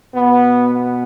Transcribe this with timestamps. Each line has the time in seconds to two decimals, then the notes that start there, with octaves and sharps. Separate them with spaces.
0.14 B2 B3
0.73 B3